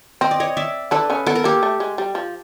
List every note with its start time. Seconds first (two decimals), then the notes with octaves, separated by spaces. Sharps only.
0.21 C4 D#5
0.31 D5
0.40 C#5 D#5
0.57 D5 E5
0.91 D3 D4 A4 B4
1.10 C#3 C#4
1.27 B3 A4
1.35 A#4
1.44 A#3 G4 A4
1.63 A3
1.80 G#3
1.98 G3
2.15 F3